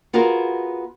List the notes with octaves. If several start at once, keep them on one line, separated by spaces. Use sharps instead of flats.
B3 F4 F#4 G#4 A#4